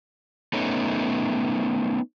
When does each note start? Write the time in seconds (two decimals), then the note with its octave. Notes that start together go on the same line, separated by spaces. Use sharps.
0.53 A3 B3 C#4 D#4